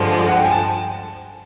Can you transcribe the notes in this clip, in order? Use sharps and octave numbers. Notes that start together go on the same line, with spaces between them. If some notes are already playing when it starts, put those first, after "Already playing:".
Already playing: G2 D3 F3 G#3
F#5
G5
G#5
A5